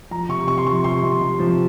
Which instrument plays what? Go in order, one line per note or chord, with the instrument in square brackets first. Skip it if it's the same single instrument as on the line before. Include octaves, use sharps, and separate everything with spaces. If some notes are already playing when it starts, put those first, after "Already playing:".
[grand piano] F3 A#5
C3 C#6
C3 C#6
C6
F3 C#6
C3 C6
C3
C3
F3